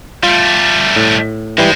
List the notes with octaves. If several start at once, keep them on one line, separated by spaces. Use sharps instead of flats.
G3 A3 F4
A2
E3 G3 G#3 C5